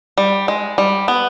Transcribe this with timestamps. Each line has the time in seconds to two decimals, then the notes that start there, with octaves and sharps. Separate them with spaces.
0.18 G3
0.48 G#3
0.78 G3
1.08 B3